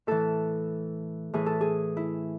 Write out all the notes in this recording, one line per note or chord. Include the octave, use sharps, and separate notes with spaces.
A2 E3 A4
A2 E3 G#4
A4
G#4
E4